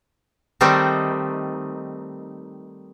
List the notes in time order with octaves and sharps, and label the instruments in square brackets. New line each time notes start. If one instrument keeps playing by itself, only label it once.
[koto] D#3 G3 A3 C4 D#4